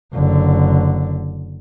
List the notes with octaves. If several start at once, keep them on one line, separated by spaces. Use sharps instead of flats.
F#1 D3